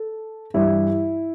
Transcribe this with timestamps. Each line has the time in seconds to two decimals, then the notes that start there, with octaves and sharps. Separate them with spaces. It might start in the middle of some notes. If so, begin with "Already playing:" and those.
Already playing: A4
0.54 G2 E3 G3 E4